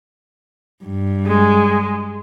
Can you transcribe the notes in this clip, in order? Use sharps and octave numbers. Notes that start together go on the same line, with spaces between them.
G2
G#3